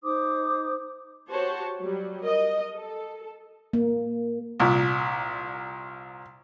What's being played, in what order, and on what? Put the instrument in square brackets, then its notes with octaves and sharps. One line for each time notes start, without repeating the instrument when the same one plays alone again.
[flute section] D#4 C5 D6 D#6
[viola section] F#4 G4 C5 C#5 A5
F#3 G3
A#4 D#5
A4
[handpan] A#3
[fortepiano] C2 A#2